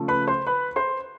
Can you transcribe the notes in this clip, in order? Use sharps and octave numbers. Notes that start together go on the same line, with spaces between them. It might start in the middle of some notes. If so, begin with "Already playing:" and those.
Already playing: C#3 F3 A3
B4 B5
C5 C6
B4 B5
C5 C6